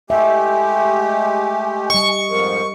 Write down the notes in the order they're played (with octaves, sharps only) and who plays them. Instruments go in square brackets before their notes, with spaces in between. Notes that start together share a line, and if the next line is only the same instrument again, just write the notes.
[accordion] G#3 A3 G4 [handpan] E5 [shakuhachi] G#5
[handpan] G3 D#5 [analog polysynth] C#6
[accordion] F2 G#2 F3 [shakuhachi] A#4